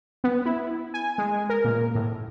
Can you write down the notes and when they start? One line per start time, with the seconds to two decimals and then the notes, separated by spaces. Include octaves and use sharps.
0.24 B3
0.46 E4
0.94 G#5
1.18 G#3
1.50 A#4
1.64 A#2
1.95 A2